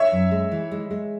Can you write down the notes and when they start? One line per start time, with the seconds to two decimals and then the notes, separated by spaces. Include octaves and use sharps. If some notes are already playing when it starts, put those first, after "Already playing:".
Already playing: C#5 E5
0.12 F#2
0.31 G#3
0.51 E3
0.71 G#3
0.91 G#3